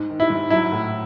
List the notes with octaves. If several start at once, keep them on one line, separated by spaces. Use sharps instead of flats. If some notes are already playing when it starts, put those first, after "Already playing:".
Already playing: G#2
D#3
E4
G#2
F#3 E4
A2